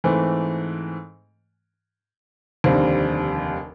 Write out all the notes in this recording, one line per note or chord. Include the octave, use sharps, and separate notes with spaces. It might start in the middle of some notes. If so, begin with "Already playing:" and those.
G#2 E3 A3 C4
F1 D#2 D3 G3 C4